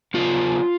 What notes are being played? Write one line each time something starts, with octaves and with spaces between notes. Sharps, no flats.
C#3 F#3 B3 F4